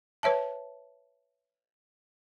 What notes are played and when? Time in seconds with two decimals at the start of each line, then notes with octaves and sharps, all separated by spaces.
0.23 B4 C#5 E5 A5